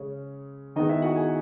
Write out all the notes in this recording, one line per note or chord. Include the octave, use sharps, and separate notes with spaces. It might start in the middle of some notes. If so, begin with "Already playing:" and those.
Already playing: C#3 G#3 C#4
D#3 G#3 B3 D#4 D#5
E4 E5
F#4 F#5
G#4 G#5